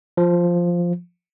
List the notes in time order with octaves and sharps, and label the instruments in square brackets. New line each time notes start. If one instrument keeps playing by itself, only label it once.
[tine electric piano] F3